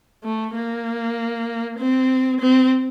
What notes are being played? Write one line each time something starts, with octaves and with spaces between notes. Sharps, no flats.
A3
A#3
C4
C4